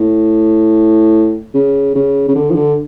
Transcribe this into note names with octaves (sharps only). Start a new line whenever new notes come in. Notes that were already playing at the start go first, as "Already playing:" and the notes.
Already playing: A2
C#3
C#3
C#3
D3
F3
D3